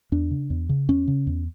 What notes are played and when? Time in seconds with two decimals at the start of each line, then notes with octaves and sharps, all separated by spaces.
0.12 E2 D4
0.31 C#3
0.50 E2
0.69 C#3
0.88 E2 C#4
1.07 C#3
1.27 E2